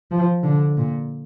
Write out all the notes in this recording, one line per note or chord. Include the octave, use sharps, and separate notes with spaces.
F3
D3
A#2